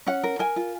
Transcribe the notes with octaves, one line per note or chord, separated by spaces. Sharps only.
C#4 F#5
A#4
A#4 G#5
F4